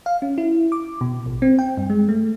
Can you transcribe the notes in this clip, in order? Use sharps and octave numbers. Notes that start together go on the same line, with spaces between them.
F5
C#4
E4
D6
B2
A1
C4
G5
G2
G#3
A3